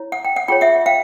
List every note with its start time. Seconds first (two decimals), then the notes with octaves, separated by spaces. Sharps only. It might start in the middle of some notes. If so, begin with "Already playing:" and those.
Already playing: E4 C#5
0.12 F#5
0.25 G5
0.36 F#5
0.48 F4 G#4 C#5 G5
0.61 E5 F#5
0.86 F5 G5